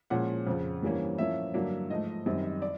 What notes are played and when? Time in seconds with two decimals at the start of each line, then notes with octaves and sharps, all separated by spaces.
0.10 A#2 F3 G#3 C#4 F#5
0.47 F2 C#3 F3
0.82 G2 E3 G3 A#3 C#4
1.18 A2 F3 A#3 C#4 E5
1.54 G2 D3 F#3 A#3 D4
1.90 G#2 F3 A3 D#5
2.26 F#2 D#3 G3 C4
2.62 D5